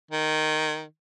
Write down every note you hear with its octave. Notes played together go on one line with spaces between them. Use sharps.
D#3